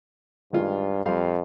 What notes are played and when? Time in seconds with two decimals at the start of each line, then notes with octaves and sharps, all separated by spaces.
0.53 G2 D#3 G#3 F4
1.06 F2 G3 F5 C6